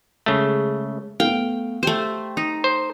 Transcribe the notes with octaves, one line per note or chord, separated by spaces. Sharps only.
C#3 G#3 A3 G7
A3 B3 F5 G5
A3 G4 C5 G5
D#4
C5